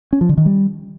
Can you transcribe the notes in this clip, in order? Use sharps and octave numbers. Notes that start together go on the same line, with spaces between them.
C#4
F3
D3
D#3
G3